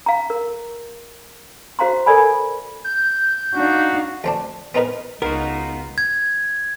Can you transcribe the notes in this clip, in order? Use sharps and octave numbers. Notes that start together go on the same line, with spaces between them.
F5 A#5
A#4
F#4 C5 F5 A#5 C6
A4 A#4 D5 G#5 B5
G6
D4 D#4 F#4 F5
D2 C4 D4
B3 C4 D#4 A#4 B4
C#2 B3 D#4 F4 F#4 A#4
G#6